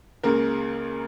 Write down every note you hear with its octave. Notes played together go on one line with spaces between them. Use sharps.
C#2 C#3 A#3 A#4